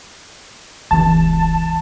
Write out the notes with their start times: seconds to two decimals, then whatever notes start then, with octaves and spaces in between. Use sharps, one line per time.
0.91 E1 C#2 E3 A5